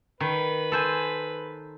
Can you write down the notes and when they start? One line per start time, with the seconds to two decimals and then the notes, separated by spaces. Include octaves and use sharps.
0.20 D#3 B4
0.72 A4 C5 G#5